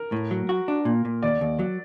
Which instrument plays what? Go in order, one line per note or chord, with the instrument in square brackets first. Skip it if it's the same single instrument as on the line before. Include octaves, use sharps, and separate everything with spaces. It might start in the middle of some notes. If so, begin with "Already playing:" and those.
Already playing: [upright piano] A#4
[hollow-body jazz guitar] A2
F#3
F#4
D4
A#2
A#2
[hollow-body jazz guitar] D#2 [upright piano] D5
[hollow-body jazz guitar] D#2
F#3